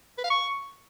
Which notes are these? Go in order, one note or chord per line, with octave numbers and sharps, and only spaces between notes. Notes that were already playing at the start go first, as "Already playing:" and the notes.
B4
F5
C#6